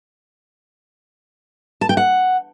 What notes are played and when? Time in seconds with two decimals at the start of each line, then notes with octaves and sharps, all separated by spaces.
1.81 A5
1.89 G5
1.97 F#5